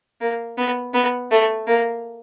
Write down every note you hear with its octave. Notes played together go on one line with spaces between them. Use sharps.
A#3
B3
B3
A3
A#3